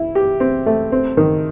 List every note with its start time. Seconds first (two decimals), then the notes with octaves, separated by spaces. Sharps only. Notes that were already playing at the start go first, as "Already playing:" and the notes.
Already playing: E4
0.15 G4
0.40 C4
0.66 A3
0.92 C4
1.17 D#3